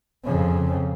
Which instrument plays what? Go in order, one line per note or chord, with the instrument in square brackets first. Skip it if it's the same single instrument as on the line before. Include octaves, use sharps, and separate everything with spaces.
[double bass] F2 C#3